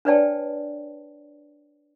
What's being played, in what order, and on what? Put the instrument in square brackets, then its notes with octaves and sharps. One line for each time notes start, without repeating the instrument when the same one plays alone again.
[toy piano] D4 B4 C#5 D5 G5 A5